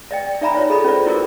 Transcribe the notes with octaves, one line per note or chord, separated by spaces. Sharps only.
D5 D#5 G5
D#4 D5 E5 G#5 A#5 B5
F4 C#5 D5
G#4 A4 D#5 B5
C#4 F4 C5 D5
E4 F#4 G#4 A#4 D5